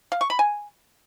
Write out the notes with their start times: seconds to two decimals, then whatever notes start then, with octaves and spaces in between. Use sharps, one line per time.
0.12 F5
0.21 C#6
0.30 B5
0.39 G#5